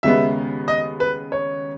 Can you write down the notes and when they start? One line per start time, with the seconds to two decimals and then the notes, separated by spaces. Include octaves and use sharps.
0.03 D#2 C#3 G#3 B3 E5
0.68 D#5
1.00 B4
1.32 C#5